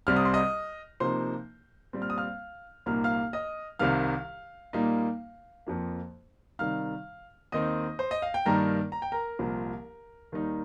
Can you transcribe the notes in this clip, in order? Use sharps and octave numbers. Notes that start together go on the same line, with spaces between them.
C2 C3 G3 C4 F6
D#6
C6
D#5 D#6
C3 F3 A#3 D#4 C5 C6
A#2 G3 C4
F6
D#6
F5 F6
C2 A#2 A#3 D#4 F6
F5 F6
D#5 D#6
C2 C3 D#3 G3 F5 F6
A#2 G3 A#3 D#4
F2 F3 A#3
C3 D#3 G3 D#4 F5 F6
D#2 D#3 C4 D#4 D#5 D#6
C5
D#5
F5
G5
G2 D#3 G3 A#3 D#4 A#4 A#5
A#5
G5
A#4 A#5
C2 A#2 F3
D#2 D#3 G3 D#4